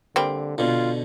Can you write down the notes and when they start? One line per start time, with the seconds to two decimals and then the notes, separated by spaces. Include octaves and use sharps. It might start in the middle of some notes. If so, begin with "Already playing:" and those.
0.16 D3 G3 A#3 C4
0.58 B2 D3 F4